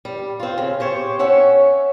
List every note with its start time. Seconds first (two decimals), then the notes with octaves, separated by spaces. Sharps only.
0.05 G3
0.40 C4 F4
0.58 C#3
0.80 G4 C5 C#5
1.19 C#4 C#5 E5 F#5